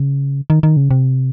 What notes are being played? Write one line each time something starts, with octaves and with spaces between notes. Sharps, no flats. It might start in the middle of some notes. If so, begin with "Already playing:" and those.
Already playing: C#3
D#3
D#3
C#3
C3